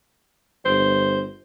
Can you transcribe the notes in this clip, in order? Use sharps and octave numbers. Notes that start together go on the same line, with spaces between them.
G1 C5